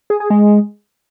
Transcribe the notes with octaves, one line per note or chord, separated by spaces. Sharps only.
G#4
G#4
G#3